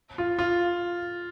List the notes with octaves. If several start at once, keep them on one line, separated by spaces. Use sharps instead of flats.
F4
F4